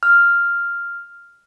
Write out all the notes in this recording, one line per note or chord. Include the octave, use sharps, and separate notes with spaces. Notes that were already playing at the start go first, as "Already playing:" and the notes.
F6